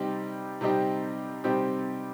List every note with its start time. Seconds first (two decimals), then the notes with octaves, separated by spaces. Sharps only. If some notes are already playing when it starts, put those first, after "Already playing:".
Already playing: C3 G3 C4 D#4 G4
0.61 C3 G3 C4 D#4 G4
1.44 C3 G3 C4 D#4 G4